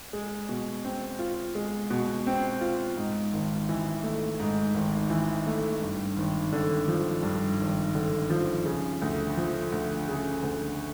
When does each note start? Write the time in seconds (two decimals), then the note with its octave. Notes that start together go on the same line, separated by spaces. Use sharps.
0.13 G#3
0.49 B2
0.84 C4
1.19 F4
1.55 G#3
1.91 B2
2.27 C4
2.61 F4
2.97 G#2
3.33 G#1
3.69 E3
4.03 A3
4.40 G#2
4.74 G#1
5.10 E3
5.46 A3
5.82 G2
6.16 G#1
6.53 D3
6.88 F3
7.23 G2
7.59 G#1
7.95 D3
8.30 F3
8.66 C#3
9.02 D2
9.37 F3
9.72 D2
10.09 C#3
10.43 D2